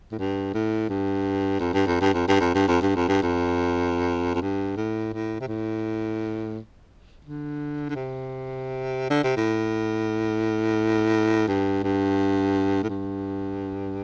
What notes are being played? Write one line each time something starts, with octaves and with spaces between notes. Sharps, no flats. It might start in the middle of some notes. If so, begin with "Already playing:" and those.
A2
G2
A2
G2
F2
G2
F2
G2
F2
G2
F2
G2
F2
G2
F2
G2
F2
F2
G2
A2
A2
C3
A2
D3
D3
C3
D3
C3
A2
G2
G2
A2
G2